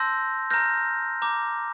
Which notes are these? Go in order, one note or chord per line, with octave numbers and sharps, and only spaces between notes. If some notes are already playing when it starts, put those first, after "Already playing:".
Already playing: A5 C6 E6 G6 A#6
A#5 F6 G6 A#6
A#5 D6 G6